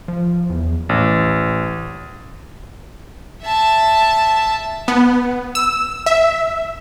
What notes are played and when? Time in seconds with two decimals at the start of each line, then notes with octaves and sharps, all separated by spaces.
0.08 F3
0.50 E2
0.89 A1
3.43 E5 A5
4.88 B3
5.55 E6
6.06 E5